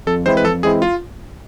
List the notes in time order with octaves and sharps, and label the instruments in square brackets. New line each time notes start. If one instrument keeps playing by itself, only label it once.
[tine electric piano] F2 [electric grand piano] A4
[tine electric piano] E3 G#3 C4 E4 [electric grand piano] C5
[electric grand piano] B4
[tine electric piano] F2 [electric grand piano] A4
[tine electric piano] E3 G#3 C4 E4 [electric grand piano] G#4
[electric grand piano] F4